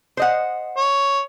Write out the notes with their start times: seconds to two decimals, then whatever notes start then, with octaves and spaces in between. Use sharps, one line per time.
0.17 C5 D#5 F#5
0.77 C#5